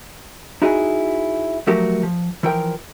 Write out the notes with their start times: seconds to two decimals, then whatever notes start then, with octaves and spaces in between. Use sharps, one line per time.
0.62 D#4 E4 F#4 G#4
1.67 F3 F#3 A3 F#4 G4 A#4
2.03 F3
2.43 E3 F3 A#4 G5